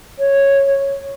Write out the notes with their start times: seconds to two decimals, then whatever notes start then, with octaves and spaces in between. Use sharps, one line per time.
0.18 C#5